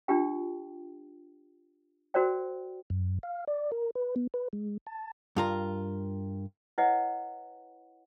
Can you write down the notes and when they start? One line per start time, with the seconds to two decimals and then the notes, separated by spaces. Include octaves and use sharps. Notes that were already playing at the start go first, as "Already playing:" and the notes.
0.08 D4 F4 G4 G5
2.14 F#4 A#4 C5 D5 G5
2.90 F#2
3.23 F5
3.48 D5
3.72 A#4
3.95 B4
4.16 B3
4.34 B4
4.53 G#3
4.87 A5
5.36 G2 F4 A#4
6.78 E4 B4 C#5 D#5 F#5 G5